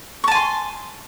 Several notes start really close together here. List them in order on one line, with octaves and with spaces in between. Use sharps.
C#6 A5 G#5 C6